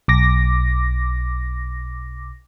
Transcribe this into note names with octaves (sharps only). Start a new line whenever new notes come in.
B1 D6 A#6